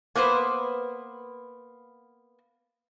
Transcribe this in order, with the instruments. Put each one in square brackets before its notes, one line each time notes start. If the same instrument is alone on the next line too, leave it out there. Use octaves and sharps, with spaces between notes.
[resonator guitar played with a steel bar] A#3 B3 B4 C5